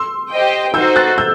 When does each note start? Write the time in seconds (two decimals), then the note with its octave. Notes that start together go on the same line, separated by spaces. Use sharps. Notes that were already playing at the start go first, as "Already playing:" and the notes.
Already playing: C6 E6
0.31 G4 C5 D#5 G5
0.74 D#4 F#4 C5 E6 G6
0.96 F#6 A6
1.18 E6 G6